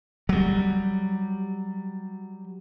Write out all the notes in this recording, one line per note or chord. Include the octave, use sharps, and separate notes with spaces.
F#3 G3